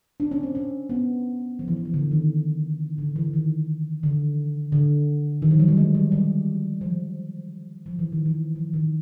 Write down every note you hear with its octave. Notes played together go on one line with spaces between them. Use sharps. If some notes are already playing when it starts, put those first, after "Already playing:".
D4
C#4
C4
C#4
B3
F3
E3
F3
E3
D3
D#3
D3
E3
D#3
D3
D3
D#3
F3
F#3
G3
G#3
G3
G3
F3
F3
E3
D#3
E3
F3
D#3